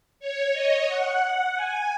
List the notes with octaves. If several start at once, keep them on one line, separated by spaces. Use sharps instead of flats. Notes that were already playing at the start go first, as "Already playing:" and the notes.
C#5
D#5
F#5
F#5
G#5